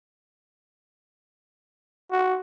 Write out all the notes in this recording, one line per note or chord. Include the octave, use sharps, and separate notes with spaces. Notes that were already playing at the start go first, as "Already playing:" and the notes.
F#4